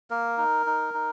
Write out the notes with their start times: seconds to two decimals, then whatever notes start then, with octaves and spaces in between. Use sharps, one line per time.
0.10 A#3 A#4
0.37 D#4
0.66 D#4
0.94 D#4